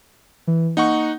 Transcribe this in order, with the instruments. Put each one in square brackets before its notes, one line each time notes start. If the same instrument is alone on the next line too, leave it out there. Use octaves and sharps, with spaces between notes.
[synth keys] E3
[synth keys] A#3 [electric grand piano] D#4 F#5 C#6